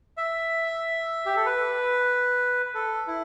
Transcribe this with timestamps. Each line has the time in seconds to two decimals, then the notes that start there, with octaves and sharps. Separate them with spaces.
0.17 E5
1.26 G4
1.36 A4
1.46 B4
2.75 A4
3.07 E4